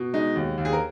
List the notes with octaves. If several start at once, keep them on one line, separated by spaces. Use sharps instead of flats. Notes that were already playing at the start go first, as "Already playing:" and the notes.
Already playing: B2
G#3 D#4
D#2
D#2
G#4
A#4